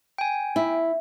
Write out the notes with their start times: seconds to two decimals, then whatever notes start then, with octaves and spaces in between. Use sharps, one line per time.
0.18 G5 G#5
0.56 E4